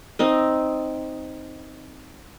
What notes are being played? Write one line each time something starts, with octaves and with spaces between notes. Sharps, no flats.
C4 D#4 D#5